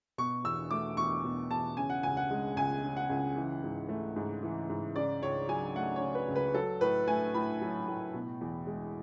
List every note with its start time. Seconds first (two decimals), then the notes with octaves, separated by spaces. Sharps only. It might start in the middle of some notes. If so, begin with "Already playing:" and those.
0.18 B2 C#6
0.44 E2 E6
0.71 A3 D6
0.97 E2 C#6
1.24 B2
1.51 E2 A5
1.77 C#3 G#5
1.90 F#5
2.03 C#2 G#5
2.17 F#5
2.30 G#3
2.56 C#2 G#5
2.84 C#3
2.97 F#5
3.10 C#2
3.36 E3
3.64 G#2
3.89 A3
4.16 G#2
4.43 E3
4.70 G#2
4.96 C#3 D5
5.22 C#2 C#5
5.49 F#3 G#5
5.76 A3 F#5
5.96 C#5
6.01 C#3
6.15 B4
6.29 C#2
6.35 B4
6.55 F#3 A4
6.81 A2 B4
7.08 A3 G#5
7.34 A2 B5
7.61 F#3
7.88 A2
8.14 B2
8.41 E2
8.67 G#3